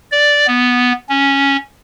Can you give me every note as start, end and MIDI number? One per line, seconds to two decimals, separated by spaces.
0.12 0.46 74
0.47 0.93 59
1.09 1.57 61